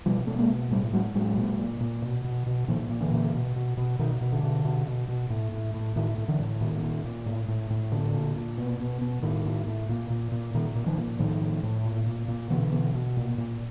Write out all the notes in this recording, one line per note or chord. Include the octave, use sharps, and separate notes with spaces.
B2 F3 G3
B2 A3
G#3 A#3
B2
A2 G3 A3
A2 F#3 G#3
A2 F#3 G#3
A#2
A#2
A#2
B2
B2
B2
A#2 D#3 F3
A#2
D3 E3
A#2
B2
B2
B2
B2 D#3
B2
D3
B2
B2
B2
B2
A2
A2
A2
A2 D#3
A2
D3 E3
A2
A#2 D#3
A#2
A#2
A2
A2
A2
A#2 D3
A#2
A#2
B2
B2
B2
A2 D#3
A2
A2
A#2
A#2
A#2
A#2 D#3
A#2
D#3 F3
A#2
A2 D#3 F3
A2
A2
A#2
A#2
A#2
B2 D3 E3
B2
B2
A#2
A#2